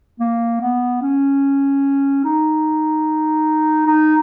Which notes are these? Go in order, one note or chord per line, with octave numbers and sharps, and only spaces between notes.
A#3
B3
C#4
D#4
D#4